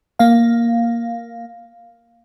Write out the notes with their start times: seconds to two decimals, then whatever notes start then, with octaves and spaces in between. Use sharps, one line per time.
0.19 A#3 F5